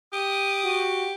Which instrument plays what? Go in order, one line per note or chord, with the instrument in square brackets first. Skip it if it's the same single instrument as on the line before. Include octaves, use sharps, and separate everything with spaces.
[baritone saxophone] G4 [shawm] D#6
[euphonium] F#4